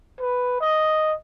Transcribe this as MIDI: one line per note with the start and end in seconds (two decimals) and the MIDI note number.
0.20 0.61 71
0.61 1.12 75